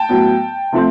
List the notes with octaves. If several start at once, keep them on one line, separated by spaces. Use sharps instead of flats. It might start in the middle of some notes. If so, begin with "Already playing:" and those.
Already playing: G5 A5
A2 F#3 B3
C3 F3 A3 C4